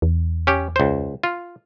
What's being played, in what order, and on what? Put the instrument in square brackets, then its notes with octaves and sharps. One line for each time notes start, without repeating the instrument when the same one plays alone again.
[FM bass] E2
[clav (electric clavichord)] C#4 G4
C#2 C5
F4